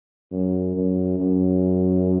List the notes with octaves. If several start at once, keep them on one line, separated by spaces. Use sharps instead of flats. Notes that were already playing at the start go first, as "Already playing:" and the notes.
F#2
F#2
F#2